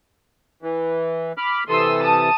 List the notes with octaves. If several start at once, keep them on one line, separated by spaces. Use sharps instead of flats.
E3
B5 D6 F6
C3 E3 A4 C6 D#6 E6
A5 D#6